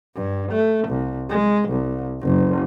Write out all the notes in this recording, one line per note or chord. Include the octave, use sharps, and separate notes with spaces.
G2
A3
C2
G#3
C2
F#1